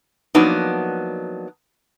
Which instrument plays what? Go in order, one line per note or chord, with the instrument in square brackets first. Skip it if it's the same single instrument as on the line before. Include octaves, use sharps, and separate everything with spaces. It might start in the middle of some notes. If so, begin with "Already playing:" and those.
[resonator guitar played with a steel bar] F3 F#3 A#3 B3 D4 D#4